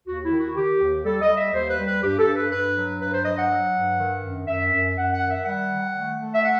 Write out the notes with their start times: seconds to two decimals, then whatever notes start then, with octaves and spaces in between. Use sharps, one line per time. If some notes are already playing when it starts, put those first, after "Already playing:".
0.07 D#2 F#4
0.24 E4
0.31 D#3
0.39 F#4
0.56 D#3 G4
0.81 D#2
1.05 G3 A4
1.21 D#5
1.29 G3
1.37 E5
1.53 D#2 C5
1.70 B4
1.78 G3
1.87 B4
2.03 G2 G4
2.19 A4
2.27 G2
2.36 B4
2.52 G2 B4
2.76 F#3
3.01 G2 B4
3.13 C5
3.25 F#3 D#5
3.38 F#5
3.49 F#3
3.74 G2
3.99 D#3
4.23 F#2
4.47 F#2 E5
4.72 F#2
4.97 F#2 F#5
5.13 F#5
5.21 D#3
5.30 E5
5.45 G3 F#5
5.71 D#3
5.95 A3
6.19 A3
6.34 E5
6.43 F#5